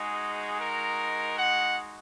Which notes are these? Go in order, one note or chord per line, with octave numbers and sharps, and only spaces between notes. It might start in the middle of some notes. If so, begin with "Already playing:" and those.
Already playing: G#3 D#4 F#4 G#4
A#4
F#5